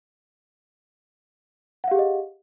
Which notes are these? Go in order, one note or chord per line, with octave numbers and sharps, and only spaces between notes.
G4 G#4 D#5 F5 F#5